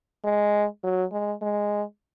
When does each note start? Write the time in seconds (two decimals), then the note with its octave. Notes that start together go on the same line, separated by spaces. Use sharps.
0.25 G#3
0.84 F#3
1.12 G#3
1.42 G#3